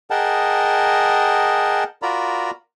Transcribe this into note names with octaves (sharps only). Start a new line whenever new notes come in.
G#4 A#4 D#5 F#5 G5 A5
F4 F#4 A#4 D5 A#5 B5